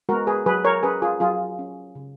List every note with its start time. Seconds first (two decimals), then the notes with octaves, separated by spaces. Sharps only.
0.09 G#3 B3 F#4 A#4
0.27 G#4 B4
0.46 F#3 G#4 B4
0.65 A#4 C#5
0.83 C#4 G#4 B4
1.02 F4 G#4
1.20 F#3 F4 G#4
1.59 C#4
1.95 C#3